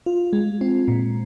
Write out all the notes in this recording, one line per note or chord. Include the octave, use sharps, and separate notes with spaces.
F4
G#3
C4
A#2